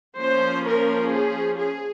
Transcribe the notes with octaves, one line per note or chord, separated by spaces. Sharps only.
F3 A#3 C#4 C5
A#4
G#4
G#4